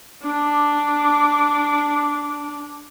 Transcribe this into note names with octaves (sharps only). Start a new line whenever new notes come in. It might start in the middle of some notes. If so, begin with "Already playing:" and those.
D4 D6